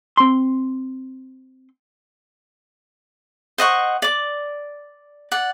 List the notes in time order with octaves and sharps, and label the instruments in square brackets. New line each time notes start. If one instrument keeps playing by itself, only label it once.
[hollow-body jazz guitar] C4 C6
[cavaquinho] C5 D#5 F#5 C#6
D5 D6
D5 F#5